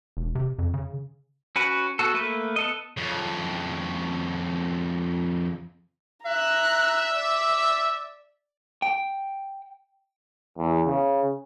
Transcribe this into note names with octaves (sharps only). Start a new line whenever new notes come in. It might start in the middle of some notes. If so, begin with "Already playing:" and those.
E1
C3
F2
C#3
C#4 F#4 B4
B3 F#4 A4
A3 A#3 B4
B3 A4 D#5
F2 C#3
E5 A#5 F#6
D5
G5
E2
C#3